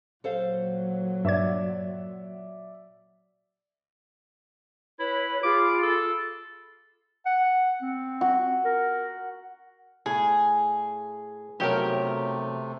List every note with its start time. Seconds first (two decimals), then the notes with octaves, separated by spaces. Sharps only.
0.24 A#2 F#3 A4 C5 F5
1.25 G2 D5 E5 G#6
4.99 E4 B4 C#5
5.43 F4 G#4 B5 D6
5.83 A4
7.26 F#5
7.82 C4
8.21 F#4
8.65 A#4
10.06 A2 E4 G#4
11.60 B1 F2 C3 F#3 A3 G4 A#4